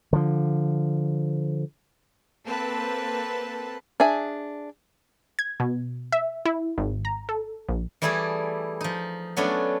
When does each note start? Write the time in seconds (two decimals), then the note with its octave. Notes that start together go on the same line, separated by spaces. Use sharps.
0.13 D3 F3
2.46 A#3 C4 A4 B4 A5
4.00 D4 G#4 E5 G#5
5.39 G#6
5.60 B2
6.12 E5
6.45 E4
6.78 G#1
7.05 A#5
7.29 A4
7.69 A#1
8.02 E3 G3 A3 E4 G#4 D5
8.81 F3 D#4
9.37 F#3 A3 B3 C#4 D4